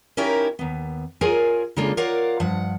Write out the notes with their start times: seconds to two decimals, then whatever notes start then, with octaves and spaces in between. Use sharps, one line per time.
0.17 C#4 D#4 E4 G4 A#4 C#5
0.59 D#2 B3
1.21 F4 G#4 A#4 C#5 G#5
1.76 C#3 G#3 A#3 D4 F4 A4
1.97 F4 A#4 C#5 D5 F5 F#5
2.40 G2 F3 F#5